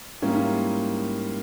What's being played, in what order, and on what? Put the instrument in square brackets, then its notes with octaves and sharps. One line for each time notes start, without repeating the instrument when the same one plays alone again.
[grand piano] G#2 G3 A#3 C#4 E4